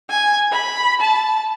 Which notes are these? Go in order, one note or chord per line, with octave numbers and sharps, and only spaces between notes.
G#5
B5
A5